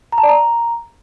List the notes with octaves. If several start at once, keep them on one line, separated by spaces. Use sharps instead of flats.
A#5
A5
D5
A#5